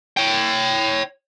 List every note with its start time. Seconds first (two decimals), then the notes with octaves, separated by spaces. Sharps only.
0.17 C#5 G5